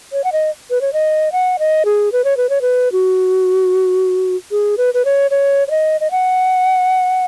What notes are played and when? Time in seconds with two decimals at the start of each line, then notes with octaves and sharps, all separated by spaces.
0.13 C#5
0.24 F#5
0.32 D#5
0.70 B4
0.81 C#5
0.93 D#5
1.32 F#5
1.59 D#5
1.85 G#4
2.12 B4
2.24 C#5
2.37 B4
2.50 C#5
2.62 B4
2.92 F#4
4.51 G#4
4.78 B4
4.94 B4
5.05 C#5
5.31 C#5
5.68 C#5
5.70 D#5
6.01 D#5
6.11 F#5